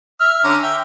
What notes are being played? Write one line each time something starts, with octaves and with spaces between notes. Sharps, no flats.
E5 F6
D3 C#4 A#5
E5 G5